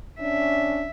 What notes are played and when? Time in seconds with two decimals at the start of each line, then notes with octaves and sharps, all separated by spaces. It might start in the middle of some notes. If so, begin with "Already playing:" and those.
0.20 C#4 D4 E5